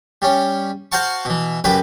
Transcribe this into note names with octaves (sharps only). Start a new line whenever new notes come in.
G3 C#4
F#4 C5 F5 F#5 A5 C#6
B2 E3
C#2 F#2 G4 B4 D6